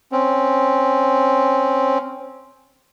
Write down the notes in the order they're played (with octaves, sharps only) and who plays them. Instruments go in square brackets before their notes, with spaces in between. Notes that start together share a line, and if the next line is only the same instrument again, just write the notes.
[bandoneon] C4 C#4